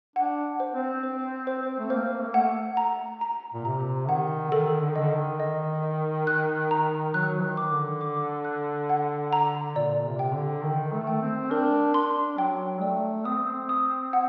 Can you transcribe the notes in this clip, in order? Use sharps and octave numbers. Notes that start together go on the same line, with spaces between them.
D4 F#5
C5
C4
C5
C5
A3
A#3 C5
A3
A#3
A3 F#5
A#5
A#5
A#2
C3 A#5
D#3 F#5
D#3 A4
D3
D#3
D3 D#5
D#3
D#5
D#5
F#6
A#5
F#3 F#6
D#3
D6
D3
D6
F#6
F#5
A#5
A#2 D5
C3
G5
D3
D#3 A#4
A3
G5
C4
D4 A#4
D4 C6
F#3 G5
A3 D5
C4 D#6
D#6
F#5